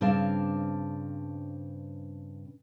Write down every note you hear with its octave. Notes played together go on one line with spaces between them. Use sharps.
G2 C#3 C4 D4 F5 A5